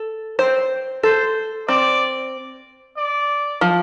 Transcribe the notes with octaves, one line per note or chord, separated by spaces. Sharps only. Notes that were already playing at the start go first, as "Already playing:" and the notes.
Already playing: A4
C4 C5
A4 C5
C4 D5
D5
F3